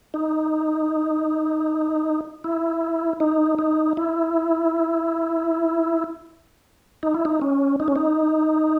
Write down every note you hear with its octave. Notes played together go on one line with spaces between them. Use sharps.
D#4
E4
D#4
D#4
E4
D#4
E4
D#4
C#4
D#4
C#4
D#4